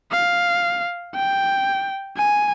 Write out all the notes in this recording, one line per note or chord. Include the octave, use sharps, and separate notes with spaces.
F5
G5
G#5